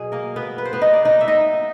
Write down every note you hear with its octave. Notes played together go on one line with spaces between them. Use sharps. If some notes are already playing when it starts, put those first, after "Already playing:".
Already playing: B2 F#3 G#4
A#3 A#4
B3 B4
B4
C5
B3 B4
D#4 D#5
D5
D#4 D#5
E5
D#4 D#5